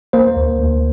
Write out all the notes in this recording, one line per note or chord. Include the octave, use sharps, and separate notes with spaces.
A#3 C5
D2
D2